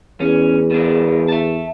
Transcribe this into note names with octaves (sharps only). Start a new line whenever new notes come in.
E2 C#4
B2 D4
E5 A5